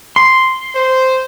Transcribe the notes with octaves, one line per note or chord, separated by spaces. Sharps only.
C6
C5